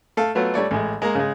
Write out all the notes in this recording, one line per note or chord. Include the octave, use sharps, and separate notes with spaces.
A3 A4 F5
F#3 A3 B3 F4
G3 A3 C#5 D5
A1 G#3
G#3 A#3 A#5
C#3 G#3